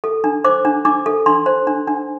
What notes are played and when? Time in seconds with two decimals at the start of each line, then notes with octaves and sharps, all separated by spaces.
0.04 A4
0.24 D4
0.44 C5 D6
0.65 D4
0.85 D4 D6
1.06 A4
1.26 D4 C6
1.46 C5
1.67 D4
1.87 D4